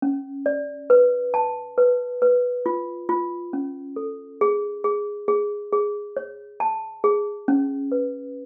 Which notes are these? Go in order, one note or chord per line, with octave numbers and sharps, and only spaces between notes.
C#4
D5
B4
A5
B4
B4
F4
F4
C#4
A4
G#4
G#4
G#4
G#4
C#5
A5
G#4
C#4
B4